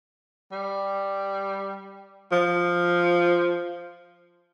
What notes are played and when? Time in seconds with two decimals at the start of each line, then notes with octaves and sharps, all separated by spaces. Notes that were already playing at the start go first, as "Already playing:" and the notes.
0.52 G3
2.32 F3